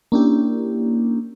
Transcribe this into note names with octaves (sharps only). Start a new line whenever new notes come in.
A#3 C#4 D4 E4 G4